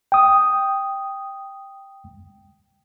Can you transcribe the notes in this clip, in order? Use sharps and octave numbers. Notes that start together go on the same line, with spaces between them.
G5 D#6